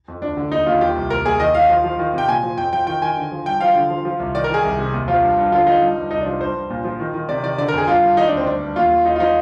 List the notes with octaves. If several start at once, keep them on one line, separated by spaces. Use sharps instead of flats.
F2
D2 D4
D3
D#2 D#4
D#2 F4
F3 G4
C2
D#2 A#4
D#2 G#4
D#3 D#5
D#3 F5
F3
F3
D#3
C3 G5
A#2 G#5
F3
F2 G5
F3 G5
D#3 G5
D#3 G#5
D3
F3
G2 G5
F3 F5
D3
F3
F3
C2
D#3 D5
A#4
D#3 G#4
C2
C3
D#2
F3 F4
G2
G2
D3 F4
F3 D#4
G2
G2
C2 D#4
D4
F3
G2 C5
G2
A#2
F3
D#3
D#3
C3 D5
D#3 D5
D3 D5
A#4
F2 G#4
G2 F4
G2
D#3 D#4
D4
D2 C4
G2 D4
G2
D#2 F4
D#2
F3 D#4
F4
F3 D#4